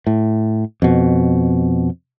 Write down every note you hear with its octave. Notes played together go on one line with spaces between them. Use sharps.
A2
F2 B2